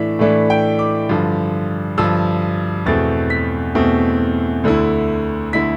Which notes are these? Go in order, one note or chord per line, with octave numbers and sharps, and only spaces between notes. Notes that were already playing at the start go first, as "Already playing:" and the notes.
Already playing: A2 E3 A3 D4 E5
A2 E3 A3 D4
G5
D6
G2 D3 F3
G2 D3 F3 E6
E2 B2 A3 C4 A6
B6
E2 B2 A3 C4
D2 D3 A3 E4
D3 A3 E4 B6